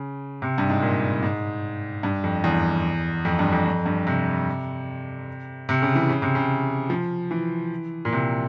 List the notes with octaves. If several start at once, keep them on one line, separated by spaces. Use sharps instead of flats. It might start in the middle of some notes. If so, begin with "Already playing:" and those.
Already playing: C#3
C3
G2
G#2
A#2
G#2
G2
F2
E2
F2
G2
F2
F2
G2
C3
C3
C#3
E3
C#3
C3
C#3
F3
E3
A#2
C3